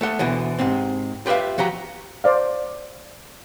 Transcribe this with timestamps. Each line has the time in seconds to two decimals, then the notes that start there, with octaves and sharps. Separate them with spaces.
0.01 A3 A4 F#5
0.19 D2 B2 D3 E3
0.59 G#2 C3 C4
1.26 F4 G4 B4 E5 F5
1.58 F3 F#4 G4 A#5
2.24 C5 D5 F5